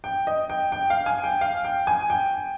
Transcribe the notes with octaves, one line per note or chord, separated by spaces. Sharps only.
G5
D#5
G5
G5
F5
G#5
G5
F5
G5
G#5
G5